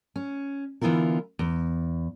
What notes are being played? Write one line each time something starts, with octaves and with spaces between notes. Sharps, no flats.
C#4
D3 E3 B3 E4 F4 A#4
E2